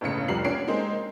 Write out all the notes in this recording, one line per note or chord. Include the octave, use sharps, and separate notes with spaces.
G1 A2 C#3 C#7
F1 C2 F3 G3 C7 F#7
C#4 D4 C#5 C7 D7
G#3 A#3 C4 D#4